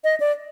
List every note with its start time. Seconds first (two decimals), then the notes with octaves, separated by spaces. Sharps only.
0.04 D#5
0.20 D5